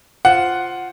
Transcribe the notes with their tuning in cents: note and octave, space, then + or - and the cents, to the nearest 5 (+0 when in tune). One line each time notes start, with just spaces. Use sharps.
F4 +0 C5 +0 F#5 +0